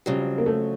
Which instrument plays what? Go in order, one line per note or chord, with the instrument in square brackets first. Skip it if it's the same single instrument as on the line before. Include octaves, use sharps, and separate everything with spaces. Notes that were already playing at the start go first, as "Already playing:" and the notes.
[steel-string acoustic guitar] F2 C#3 F#3 [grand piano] G3
[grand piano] A#3
A3